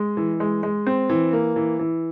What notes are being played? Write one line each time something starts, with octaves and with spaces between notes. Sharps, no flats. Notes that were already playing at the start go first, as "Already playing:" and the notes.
Already playing: G#3
E3
G#3
G#3
C4
E3
A#3
E3
E3